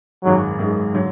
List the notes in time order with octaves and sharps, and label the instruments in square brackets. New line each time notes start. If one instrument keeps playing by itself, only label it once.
[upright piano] G#1 F#2 D#3 G#3 [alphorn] F#3
[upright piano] G#1 F#2 D#3 G#3
D3 F#3